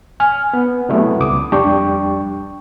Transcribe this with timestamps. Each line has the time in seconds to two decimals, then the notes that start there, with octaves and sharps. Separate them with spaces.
0.20 G#5 F6
0.54 B3
0.89 C3 F#3 G3 A3 B3 E4
1.20 C#2 D6 D#6
1.52 F2 G3 D4 G5 C#6